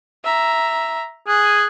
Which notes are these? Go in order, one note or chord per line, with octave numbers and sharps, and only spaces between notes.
E5 A#5
G#4 G#5 F#6